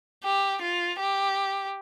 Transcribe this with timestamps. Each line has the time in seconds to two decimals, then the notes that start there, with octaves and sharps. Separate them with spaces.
0.24 G4
0.61 F4
0.99 G4